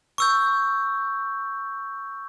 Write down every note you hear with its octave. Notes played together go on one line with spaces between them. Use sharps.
C#6 E6 G6